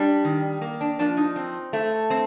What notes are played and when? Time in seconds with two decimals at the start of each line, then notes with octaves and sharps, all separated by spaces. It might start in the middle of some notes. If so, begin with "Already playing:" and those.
Already playing: G3 D4
0.25 D#3
0.61 A#3
0.81 D4
0.99 F3 D4
1.17 D#4
1.36 C4
1.73 A3
2.10 C4